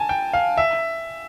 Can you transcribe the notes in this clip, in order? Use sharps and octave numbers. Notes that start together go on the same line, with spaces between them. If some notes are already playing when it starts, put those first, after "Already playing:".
Already playing: G#5 A5
G5
F5
E5